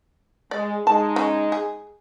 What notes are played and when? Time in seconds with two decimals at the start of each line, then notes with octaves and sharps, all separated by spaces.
0.51 G#3 D5
0.87 G#3 D#4 A5
1.16 C#3
1.52 G#4